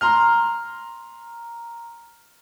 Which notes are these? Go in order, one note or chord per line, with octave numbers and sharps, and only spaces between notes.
A#5 C6 F6